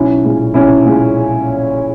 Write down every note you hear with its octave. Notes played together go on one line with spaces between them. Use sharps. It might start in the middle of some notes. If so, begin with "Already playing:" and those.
Already playing: B1 C#4 E4
A#2 G#3
B1 C#4 E4
A#2 G#3